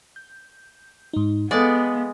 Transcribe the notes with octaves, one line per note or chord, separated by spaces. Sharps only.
G6
G#2 D#4
G#3 B3 A4 D5 F5